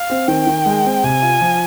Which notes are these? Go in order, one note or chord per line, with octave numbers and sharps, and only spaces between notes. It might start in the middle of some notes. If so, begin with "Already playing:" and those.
Already playing: F5
C4
D#3 G5
D#3
G#3
C4
C3 G#5
F4
F3